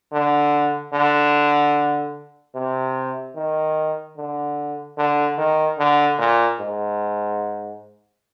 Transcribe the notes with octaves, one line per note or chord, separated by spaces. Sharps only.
D3
D3
C3
D#3
D3
D3
D#3
D3
A#2
G#2